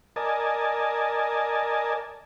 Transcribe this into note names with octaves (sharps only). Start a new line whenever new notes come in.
A#4 D5 D#5 G#5 A5